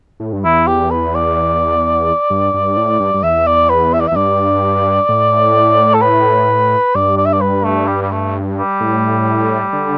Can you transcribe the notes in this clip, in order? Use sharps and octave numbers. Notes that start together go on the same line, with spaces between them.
A2
G2
E2 E4
G4
B4
D5
G2
G2
A2
G2
G2
E2 E5
D5
B4
E5
D5
E5
E2
G2 D5
A2
A4
B4
G2 D5
D5
E5
D5
B4
A3
G3
G3
A3
G3
A2
D3